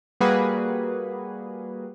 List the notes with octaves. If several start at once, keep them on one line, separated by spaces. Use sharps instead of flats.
G3 A#3 F#4 G#4 B4